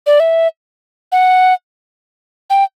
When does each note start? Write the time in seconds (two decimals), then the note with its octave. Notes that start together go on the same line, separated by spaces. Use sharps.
0.06 D5
0.20 E5
1.12 F#5
2.50 G5